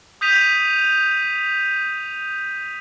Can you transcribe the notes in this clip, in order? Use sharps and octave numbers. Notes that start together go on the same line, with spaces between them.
D#6 G6 B6 D#7 F7